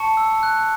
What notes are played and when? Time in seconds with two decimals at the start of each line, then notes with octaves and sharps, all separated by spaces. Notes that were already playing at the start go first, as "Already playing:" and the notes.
Already playing: A5 C#6 C#7
0.17 E6
0.43 F#6